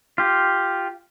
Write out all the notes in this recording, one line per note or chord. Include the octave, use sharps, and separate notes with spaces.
F4 G4